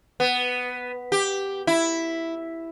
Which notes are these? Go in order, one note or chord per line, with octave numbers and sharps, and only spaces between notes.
B3
G4
E4